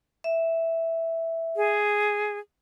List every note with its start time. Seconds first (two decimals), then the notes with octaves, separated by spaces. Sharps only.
0.24 E5
1.56 G#4